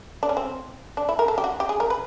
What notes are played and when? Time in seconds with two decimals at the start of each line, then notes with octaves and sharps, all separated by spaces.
0.23 D4
0.29 C#4
0.37 C4
0.97 D4
1.09 E4
1.19 A#4
1.28 A4
1.38 G4
1.44 F#4
1.60 G4
1.69 G#4
1.80 A#4
1.90 B4